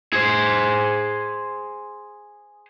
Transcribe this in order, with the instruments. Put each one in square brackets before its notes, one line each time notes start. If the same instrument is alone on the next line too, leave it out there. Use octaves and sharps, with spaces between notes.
[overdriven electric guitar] G#4 C5